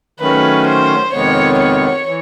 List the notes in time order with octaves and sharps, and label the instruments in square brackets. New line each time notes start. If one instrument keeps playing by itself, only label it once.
[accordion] D#3 F#3 A3 C#4 [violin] B4
[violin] C5
[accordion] F2 C3 D#3 G#3 B3 [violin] C#5
[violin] C#5
[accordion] E3